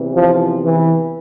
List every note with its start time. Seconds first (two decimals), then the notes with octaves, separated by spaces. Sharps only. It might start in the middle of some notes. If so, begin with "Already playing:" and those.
Already playing: E2 C3 E3
0.14 F3
0.63 E3